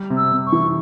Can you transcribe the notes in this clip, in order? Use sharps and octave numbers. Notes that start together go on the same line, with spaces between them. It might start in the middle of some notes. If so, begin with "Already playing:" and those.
Already playing: G3
C3
E6
C3
C#6
E3